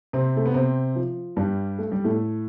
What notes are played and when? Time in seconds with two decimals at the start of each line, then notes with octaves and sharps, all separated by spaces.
0.13 C3 C4
0.37 A3
0.46 B3
0.54 C3 C4
0.96 F3
1.37 G2 G3
1.79 A3
1.92 G3
2.04 A2 A3